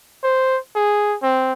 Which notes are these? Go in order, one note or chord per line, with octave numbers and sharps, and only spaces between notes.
C5
G#4
C4